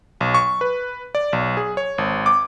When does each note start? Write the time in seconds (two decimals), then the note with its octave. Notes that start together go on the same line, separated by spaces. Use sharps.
0.21 B1
0.34 C#6
0.61 B4
1.15 D5
1.33 B1
1.57 G#4
1.77 C#5
1.98 G#1
2.26 D6